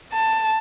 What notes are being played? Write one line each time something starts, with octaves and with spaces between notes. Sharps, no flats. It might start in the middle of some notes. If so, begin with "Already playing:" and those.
A5